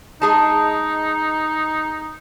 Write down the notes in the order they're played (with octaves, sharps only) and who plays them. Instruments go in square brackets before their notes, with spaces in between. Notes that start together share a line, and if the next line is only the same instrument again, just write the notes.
[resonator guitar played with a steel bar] G#3 G#4 A5 [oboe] D#4